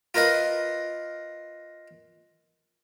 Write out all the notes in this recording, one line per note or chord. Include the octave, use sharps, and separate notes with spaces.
F4 A#4 B4 D#5 F5